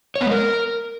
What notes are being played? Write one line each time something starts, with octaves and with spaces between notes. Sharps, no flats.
C#5
B3
G#3
A#4